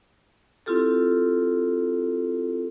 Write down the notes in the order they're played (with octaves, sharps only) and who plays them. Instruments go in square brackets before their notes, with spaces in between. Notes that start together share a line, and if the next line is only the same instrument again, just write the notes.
[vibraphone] C4 E4 F4 G4 A4